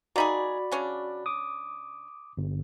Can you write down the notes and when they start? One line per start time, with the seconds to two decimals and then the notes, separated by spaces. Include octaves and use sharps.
0.16 A#3 D#4 F#4 G#4 D5 B5
0.72 C#3 C#4 D4
1.26 D6 D#6
2.37 G1